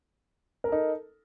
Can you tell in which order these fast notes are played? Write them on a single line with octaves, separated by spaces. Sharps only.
A#4 A4 D#4